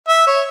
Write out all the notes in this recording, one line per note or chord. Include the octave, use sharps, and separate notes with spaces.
E5
C#5